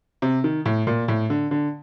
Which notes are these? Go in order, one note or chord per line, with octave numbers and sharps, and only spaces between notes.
C3
D#3
A2
A#2
A2
D3
D3